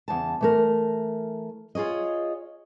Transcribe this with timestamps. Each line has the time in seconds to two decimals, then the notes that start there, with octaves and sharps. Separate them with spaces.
0.08 E2 C#3 A5
0.41 E3 A3 A#4
1.75 F4 G#4 C#5 D#5